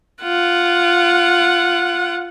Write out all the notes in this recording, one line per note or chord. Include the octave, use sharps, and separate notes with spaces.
F4 F#5